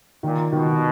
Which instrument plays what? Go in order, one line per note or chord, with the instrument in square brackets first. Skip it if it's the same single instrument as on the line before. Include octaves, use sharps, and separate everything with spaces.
[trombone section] A#2 [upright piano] D#3
[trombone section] B2 [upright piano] D#3